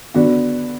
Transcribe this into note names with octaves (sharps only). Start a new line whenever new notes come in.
D3 B3 D4 F#4